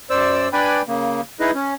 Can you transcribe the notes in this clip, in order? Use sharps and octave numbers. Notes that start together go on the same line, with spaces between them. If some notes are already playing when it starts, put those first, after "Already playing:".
F#2 C5 D5 E6
D4 B4 D5 G5 G#5 B5
C#3 A#3
D#4 E4 G#4 B4 D#5
C#4